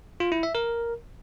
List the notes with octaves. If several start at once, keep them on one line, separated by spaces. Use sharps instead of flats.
F4
E4
E5
A#4